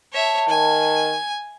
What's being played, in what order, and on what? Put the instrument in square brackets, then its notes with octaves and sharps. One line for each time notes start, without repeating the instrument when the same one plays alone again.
[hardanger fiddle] C#5 E5 [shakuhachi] A5
[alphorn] D#3 [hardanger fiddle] G#5